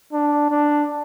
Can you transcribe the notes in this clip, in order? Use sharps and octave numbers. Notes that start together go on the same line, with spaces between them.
D4
D4